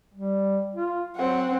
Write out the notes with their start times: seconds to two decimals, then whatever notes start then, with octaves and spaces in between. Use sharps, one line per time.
0.14 G3
0.75 F4
1.17 F#3 C4 F#5